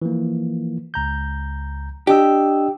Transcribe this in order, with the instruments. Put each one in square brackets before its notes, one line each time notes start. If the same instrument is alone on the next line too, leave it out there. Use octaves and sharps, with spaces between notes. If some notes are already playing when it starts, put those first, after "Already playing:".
[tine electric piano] E3 F3 A#3
C#2 A#5 G6
[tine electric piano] D4 D#5 E6 [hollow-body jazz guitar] G4